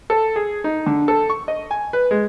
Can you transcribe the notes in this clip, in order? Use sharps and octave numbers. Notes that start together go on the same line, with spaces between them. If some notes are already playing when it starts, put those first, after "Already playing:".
A4
G#4
D#4
D3
A4
C#6
D#5
G#5
B4
G#3